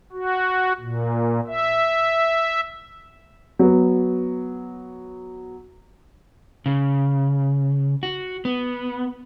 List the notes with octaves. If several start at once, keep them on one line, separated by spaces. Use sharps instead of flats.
F#4
A#2
E5
F#3 B3
C#3
F#4
B3